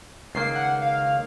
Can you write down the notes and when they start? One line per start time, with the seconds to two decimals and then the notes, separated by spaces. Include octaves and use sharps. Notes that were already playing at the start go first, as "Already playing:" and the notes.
0.35 C#2 D#3 A#3 C7
0.55 F#5
0.81 F5